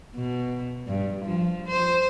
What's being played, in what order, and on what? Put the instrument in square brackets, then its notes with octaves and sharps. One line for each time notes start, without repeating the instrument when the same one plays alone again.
[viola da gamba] B2
G2
F3
C5